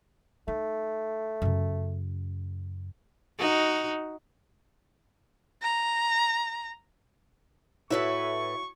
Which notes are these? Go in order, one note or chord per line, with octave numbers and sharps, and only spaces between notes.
A3 D#4
F#2 C#3
D#4 F#4
A#5
A2 E4 F#4 B4 C#5 E5 C#6